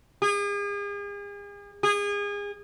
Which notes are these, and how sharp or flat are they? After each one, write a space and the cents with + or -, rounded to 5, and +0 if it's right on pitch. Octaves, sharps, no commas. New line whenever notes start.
G#4 -40
G#4 -30